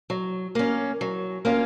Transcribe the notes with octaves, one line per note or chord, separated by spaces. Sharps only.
F#3
A#3 C#4
F#3
A#3 C#4 F4